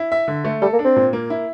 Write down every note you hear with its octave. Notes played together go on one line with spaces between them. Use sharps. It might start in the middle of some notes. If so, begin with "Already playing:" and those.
Already playing: E4
E5
D3
A3
G3 A4
A#3
D4
C4
A#2
A#3
E4